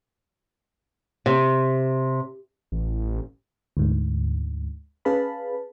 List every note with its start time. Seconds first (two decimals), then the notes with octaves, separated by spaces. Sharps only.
1.26 C3
2.72 A1
3.77 D2 G#2
5.05 C#4 G#4 B4 F5 A5 B5